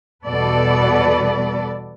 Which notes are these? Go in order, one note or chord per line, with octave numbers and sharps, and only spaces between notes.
E2 B2 G3 A4 B4 D5